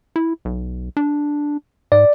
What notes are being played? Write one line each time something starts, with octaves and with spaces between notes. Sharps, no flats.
E4
B1
D4
G#2 D5